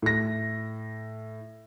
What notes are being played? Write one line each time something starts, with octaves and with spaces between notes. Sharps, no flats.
A2 A#6